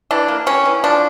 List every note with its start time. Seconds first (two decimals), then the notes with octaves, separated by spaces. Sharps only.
0.11 E3 D4
0.28 A#3
0.46 G3 C#4
0.66 E3
0.84 F3 D4